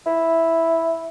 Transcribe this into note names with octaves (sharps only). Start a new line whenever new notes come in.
E4